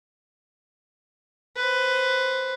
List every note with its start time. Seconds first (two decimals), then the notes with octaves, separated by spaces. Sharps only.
1.56 B4 C5